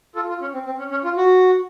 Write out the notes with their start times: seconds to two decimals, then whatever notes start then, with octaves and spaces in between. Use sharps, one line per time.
0.15 F4 A4
0.29 F4
0.41 C#4
0.54 C4
0.66 C4
0.79 C#4
0.91 C#4
1.04 F4
1.17 F#4